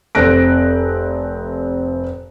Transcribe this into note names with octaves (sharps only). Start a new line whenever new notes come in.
F1 C4 F#6 A#6 D7